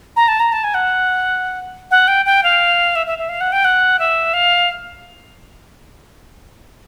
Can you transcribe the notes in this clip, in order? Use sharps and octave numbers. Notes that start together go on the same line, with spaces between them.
A#5
A5
A#5
A5
G#5
F#5
F#5
G5
G5
F5
E5
E5
E5
F5
F#5
G5
F#5
E5
F5